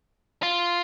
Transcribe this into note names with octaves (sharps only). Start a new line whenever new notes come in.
F4